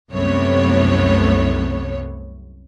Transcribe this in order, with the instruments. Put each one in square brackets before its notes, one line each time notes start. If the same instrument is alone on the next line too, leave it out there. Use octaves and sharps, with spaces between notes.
[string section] C2 F#2 C3 A3 B3 C#5